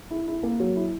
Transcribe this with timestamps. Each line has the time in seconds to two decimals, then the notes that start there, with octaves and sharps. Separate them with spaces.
0.11 E4
0.27 E4
0.43 A#3
0.60 F#3
0.76 E4